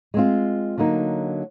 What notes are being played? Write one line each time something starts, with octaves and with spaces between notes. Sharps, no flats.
G#3 C4 F4
D3 F#3 A#3 D#4